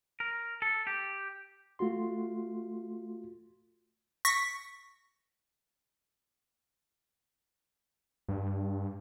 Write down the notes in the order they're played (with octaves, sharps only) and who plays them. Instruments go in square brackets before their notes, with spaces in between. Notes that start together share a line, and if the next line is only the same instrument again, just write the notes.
[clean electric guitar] A#4
A4
G4
[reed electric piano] A3 F4 F#4 C6
[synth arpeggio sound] C#6 A#6 B6
[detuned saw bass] G2